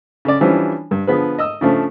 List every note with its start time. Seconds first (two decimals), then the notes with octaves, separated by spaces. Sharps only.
0.25 C#3 A4 D5
0.41 E3 F3 G3 C#4 D4
0.91 G2
1.07 D3 F3 B3 G#4 B4
1.38 D#5 D#6 E6
1.61 C#3 F3 A3 D4